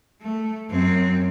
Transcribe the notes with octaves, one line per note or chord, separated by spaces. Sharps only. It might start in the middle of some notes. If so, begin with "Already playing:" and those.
A3
F#2 C4